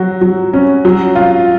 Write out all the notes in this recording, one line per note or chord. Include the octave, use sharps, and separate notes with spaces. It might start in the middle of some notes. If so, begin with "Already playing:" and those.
Already playing: F#3 F#4
F#3
C#4
F#3
F4